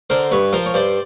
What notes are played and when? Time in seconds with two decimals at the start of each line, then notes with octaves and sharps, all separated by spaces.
0.10 D3 A#4 C5
0.31 G2 B4 C#5
0.53 F3 A#4 C5
0.66 C#5
0.74 G2 C5 D5